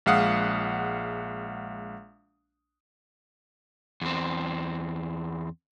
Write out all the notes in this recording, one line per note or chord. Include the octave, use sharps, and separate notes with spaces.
A#1 G#3 F5 F#5 D#6
E2 C4